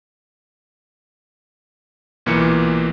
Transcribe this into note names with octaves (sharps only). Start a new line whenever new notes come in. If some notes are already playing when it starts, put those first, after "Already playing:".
B1 A#2 E3 A#3 C#7